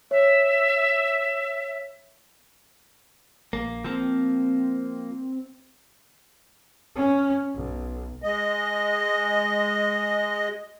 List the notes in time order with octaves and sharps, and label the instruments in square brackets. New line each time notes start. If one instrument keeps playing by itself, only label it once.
[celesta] C#5 [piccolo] E5
[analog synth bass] A#1 [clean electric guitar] A#3
[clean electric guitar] F3 A#3 [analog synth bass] C4
[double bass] C#4
B1
[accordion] G#3 D#5